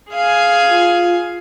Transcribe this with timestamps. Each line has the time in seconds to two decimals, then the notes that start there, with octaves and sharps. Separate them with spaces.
0.12 G#4 F5 G#5
0.70 F4